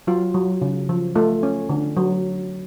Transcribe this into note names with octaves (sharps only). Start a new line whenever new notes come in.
F#3 F4
F#3
C#3
F3
A3 F4
C#4
D3
F#3